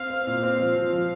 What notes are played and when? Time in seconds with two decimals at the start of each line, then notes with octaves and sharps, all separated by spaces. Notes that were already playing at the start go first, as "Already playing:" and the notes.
Already playing: C4 F5
0.10 C4
0.27 A#2
0.43 C4
0.59 F3
0.76 F3
0.93 F3